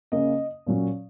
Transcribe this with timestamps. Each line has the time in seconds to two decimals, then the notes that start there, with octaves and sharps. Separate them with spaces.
0.12 C#3 A#3 C#4 D#5
0.67 A#2 F#3 C#4